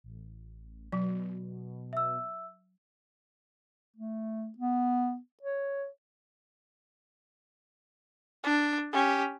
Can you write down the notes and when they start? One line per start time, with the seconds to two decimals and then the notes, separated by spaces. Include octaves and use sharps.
0.04 A1
0.92 B2 F#3
1.93 E5 E6
3.96 A3
4.58 B3
5.42 C#5
8.44 D4
8.92 C#4 G4